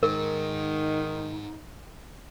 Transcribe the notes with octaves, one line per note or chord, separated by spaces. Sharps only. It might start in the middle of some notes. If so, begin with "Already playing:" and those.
G#2 D#3 D#4 A#4